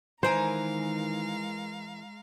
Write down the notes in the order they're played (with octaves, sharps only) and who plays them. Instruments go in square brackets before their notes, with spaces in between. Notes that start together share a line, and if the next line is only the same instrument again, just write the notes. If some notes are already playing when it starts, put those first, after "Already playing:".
[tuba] D#3 [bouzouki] E3 A#4 G#5 [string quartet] G#3 F5 A#5 [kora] C5